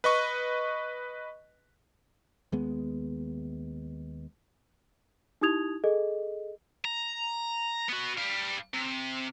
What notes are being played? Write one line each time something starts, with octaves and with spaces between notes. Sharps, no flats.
B4 D#5 C#6
D#2 G#3 B3
D#4 E4 G4 D#6 G#6 F7
G#4 A4 D#5
A#5
B3 F#4
G3 F5
C3